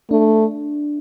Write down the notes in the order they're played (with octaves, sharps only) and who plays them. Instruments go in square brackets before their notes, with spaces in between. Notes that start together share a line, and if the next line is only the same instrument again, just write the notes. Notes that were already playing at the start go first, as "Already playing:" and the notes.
[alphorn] A3 [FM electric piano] D4